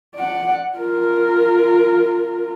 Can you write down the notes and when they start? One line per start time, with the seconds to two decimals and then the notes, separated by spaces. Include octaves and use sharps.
0.15 D5 F#5
0.76 F4 A#4